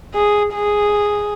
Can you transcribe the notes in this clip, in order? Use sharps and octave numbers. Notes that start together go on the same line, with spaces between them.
G#4
G#4